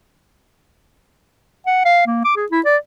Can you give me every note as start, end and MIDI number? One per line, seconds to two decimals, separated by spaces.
1.67 1.83 78
1.85 2.03 77
2.07 2.22 58
2.25 2.36 86
2.37 2.46 68
2.51 2.60 64
2.65 2.77 74